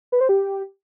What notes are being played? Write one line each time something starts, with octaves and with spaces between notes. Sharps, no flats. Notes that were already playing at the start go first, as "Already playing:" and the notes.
B4
C5
G4